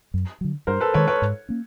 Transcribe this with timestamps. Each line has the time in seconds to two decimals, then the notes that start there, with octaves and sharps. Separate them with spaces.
0.14 F#2
0.41 D3 F#3
0.67 G2 A#4 C5
0.80 A4 B4
0.94 D#3 G#3 B4 C#5
1.07 B4 C#5
1.22 G#2
1.49 A#3 C#4